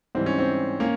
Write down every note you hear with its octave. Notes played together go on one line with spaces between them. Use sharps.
G#2 E3 G3 C4
C#4
C4
A#3 C#4